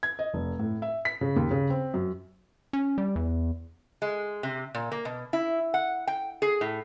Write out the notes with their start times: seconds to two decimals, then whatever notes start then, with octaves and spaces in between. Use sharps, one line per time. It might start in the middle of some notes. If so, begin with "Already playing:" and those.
0.03 G#6
0.19 D#5
0.34 F1
0.59 A2
0.82 E5
1.05 B6
1.21 C#3
1.36 D#2
1.51 C#3
1.70 C4
1.94 F#2
2.73 C#4
2.98 G3
3.16 E2
4.02 G#3
4.43 C3
4.75 A#2
4.92 A#3
5.05 B2
5.33 E4
5.74 F#5
6.07 G5
6.42 G#4
6.61 A2